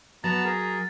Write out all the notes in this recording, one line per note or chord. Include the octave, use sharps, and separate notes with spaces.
F#3 B3 A5 A#5 A6
G#4 A#4